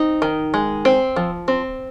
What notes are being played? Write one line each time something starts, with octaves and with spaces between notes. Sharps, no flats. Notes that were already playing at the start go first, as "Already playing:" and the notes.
Already playing: C4 D#4
D#3
G#3
C4
F3
C4